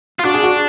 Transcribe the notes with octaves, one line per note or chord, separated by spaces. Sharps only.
F4
D4 F#4
G#4
F#4